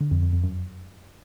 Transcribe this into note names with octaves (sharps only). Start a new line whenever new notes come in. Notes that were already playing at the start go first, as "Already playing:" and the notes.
D3
F2
F2
F2
F#2